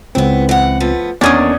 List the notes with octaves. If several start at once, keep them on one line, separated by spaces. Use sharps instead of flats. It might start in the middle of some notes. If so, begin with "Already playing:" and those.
C#2 B3 C4 E4
E3 F#5
F3 A3 B3
E2 D#3 A#3 C#4 D4 D5 D#6 G#6